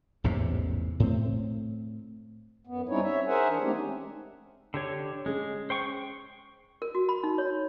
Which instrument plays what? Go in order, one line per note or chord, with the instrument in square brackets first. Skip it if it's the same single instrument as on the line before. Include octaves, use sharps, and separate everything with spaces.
[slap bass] A1 E2 G#2 C3
A2 C4
[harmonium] F#2 B3
G3 C4 C#4 D#4 E4 C#5
C#5 E5
G#4 A#4 C5 E5 F#5 G#5
E3 D4
G#3 A3 C4 C#4 D#4 G4
[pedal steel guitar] D3 G4 C#5
[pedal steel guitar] G#3 [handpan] C#4 G#4
[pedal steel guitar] C5 G5 C#6
[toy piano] A#4
F#4
B5
D#4
C#5